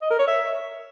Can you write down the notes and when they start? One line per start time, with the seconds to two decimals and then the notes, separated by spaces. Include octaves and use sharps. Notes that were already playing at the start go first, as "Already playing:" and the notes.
0.02 D#5
0.10 A#4
0.19 C#5
0.27 E5